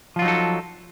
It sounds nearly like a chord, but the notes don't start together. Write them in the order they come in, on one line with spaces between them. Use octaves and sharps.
F3 F4 F#3 D#4 A4